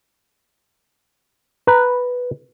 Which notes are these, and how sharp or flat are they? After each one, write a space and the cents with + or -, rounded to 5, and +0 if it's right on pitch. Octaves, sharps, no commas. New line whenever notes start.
B4 +0 A#5 +0